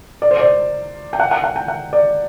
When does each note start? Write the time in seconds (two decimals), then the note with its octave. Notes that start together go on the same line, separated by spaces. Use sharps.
0.22 D5
0.31 C5
0.40 D5
1.13 G5
1.20 F#5
1.31 F#5
1.44 F#5
1.56 G5
1.68 F#5
1.93 D5